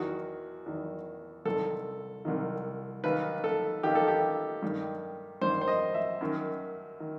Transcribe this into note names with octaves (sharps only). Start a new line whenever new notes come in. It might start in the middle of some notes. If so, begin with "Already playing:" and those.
Already playing: E2 D#3 F#4
E2 D#3
C2 C3 D#3 A4
C2 C3 D#3
D#2 D#3 B4
A4
D#2 D#3 G4
A4
G4
G2 D#3
G2 D#3 C5
C5
D#5
E5
F#2 D#3
D#3